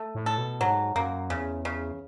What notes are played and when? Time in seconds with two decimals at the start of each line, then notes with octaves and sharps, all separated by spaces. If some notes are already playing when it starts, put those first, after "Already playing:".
Already playing: A3
0.15 A2
0.26 A4
0.38 B2
0.61 G#2 F#3
0.96 F#2 A#3
1.30 E2 C#3
1.65 C#3